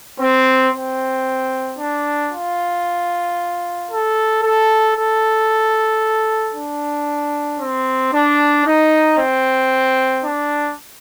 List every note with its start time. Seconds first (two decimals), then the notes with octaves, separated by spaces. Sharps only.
0.19 C4
0.73 C4
1.78 D4
2.31 F4
3.89 A4
4.42 A4
4.95 A4
6.54 D4
7.59 C4
8.12 D4
8.65 D#4
9.18 C4
10.23 D4